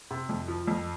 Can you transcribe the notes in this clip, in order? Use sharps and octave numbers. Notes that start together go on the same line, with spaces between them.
C3
F2
F3
F2